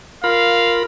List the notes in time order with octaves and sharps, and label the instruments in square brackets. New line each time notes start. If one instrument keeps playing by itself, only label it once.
[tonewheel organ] F4 A#4 B5 [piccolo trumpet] F5